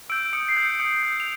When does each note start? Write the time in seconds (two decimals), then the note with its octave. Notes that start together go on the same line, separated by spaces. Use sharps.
0.10 E6 G6 D7
0.33 D#6 C#7
0.49 C7
0.57 G6
0.65 C#7
0.79 D#6 C#7
1.03 G6
1.20 F7